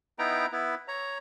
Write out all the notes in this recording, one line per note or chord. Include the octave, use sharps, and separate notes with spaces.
B3 D#4 E4 G5 A#5
B3 E4
C#5 A#5